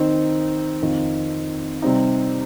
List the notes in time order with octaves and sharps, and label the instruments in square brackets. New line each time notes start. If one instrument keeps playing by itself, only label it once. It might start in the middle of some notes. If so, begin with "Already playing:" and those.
Already playing: [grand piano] D#3 C4 D#4
F2 D#3 C4 F4
C3 G3 C4 D#4